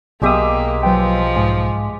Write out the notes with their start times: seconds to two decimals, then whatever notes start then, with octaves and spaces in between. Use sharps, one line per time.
0.22 B1 B2 G#3 A#3 G4 E5 D#6
0.83 F3 F#3 B4 G5
1.36 G#2 D#5 G#5